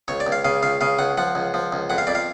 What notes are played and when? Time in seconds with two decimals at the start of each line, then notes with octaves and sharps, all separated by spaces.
0.08 C#2 C#5
0.20 D5
0.27 C#2
0.32 F5
0.45 C#3 F5
0.63 C#2 F5
0.81 C#3 F5
0.99 C#2 F#5
1.17 F3 F#5
1.35 C#2
1.54 F3
1.72 C#2
1.90 F2 F#5
1.98 F5
2.07 F2 D5
2.15 F5